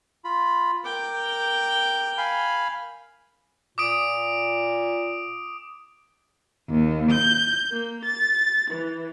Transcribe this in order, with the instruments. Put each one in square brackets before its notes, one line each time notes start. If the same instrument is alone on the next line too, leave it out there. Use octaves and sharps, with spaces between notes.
[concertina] F4 B5
[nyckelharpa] A#4 G5 [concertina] D6
[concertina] F5 G#5 B5
[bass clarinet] A#2 [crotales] D6 D#6 D7
[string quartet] D#2
G6
A#3
A6
E3